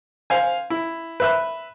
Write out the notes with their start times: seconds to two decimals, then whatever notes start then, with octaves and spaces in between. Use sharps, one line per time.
0.30 C5 F5 G#5
0.70 E4
1.20 B4 E5 F#6